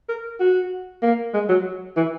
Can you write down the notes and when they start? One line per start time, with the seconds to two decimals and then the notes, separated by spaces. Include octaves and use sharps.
0.09 A#4
0.40 F#4
1.03 A#3
1.34 G#3
1.49 F#3
1.97 E3